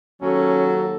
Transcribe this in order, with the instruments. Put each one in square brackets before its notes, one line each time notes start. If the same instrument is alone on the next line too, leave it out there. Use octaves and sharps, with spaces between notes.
[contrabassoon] D#2 [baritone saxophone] F#3 [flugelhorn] C#4 [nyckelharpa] A4